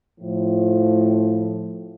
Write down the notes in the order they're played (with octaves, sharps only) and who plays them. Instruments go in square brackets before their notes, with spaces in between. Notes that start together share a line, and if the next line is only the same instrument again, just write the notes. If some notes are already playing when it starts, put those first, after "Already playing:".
[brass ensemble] A2 F3